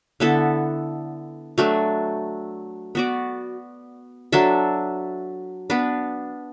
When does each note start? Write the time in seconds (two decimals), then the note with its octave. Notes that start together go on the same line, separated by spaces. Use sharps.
0.20 D3 B3 E4 A4
1.58 F#3 A3 D4
2.95 B3 F#4 D5
4.32 F#3 D4 A4 E5
5.70 B3 D4 B4